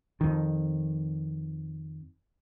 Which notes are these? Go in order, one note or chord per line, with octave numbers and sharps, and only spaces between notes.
F2 D#3